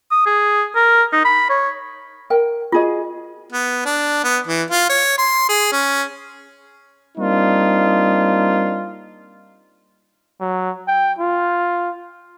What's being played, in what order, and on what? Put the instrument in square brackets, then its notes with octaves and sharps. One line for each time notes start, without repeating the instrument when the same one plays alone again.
[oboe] D#6
G#4
A#4
D#4
B5
C#5
[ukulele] A#4 G5
[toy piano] F4 [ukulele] F#4 G#4 D#5
[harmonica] B3
D4
B3
E3
F4
C#5
C6
G#4
C#4
[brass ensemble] G3 A#3 C4 D4 D#4 F4
[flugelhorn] F#3
G5
F4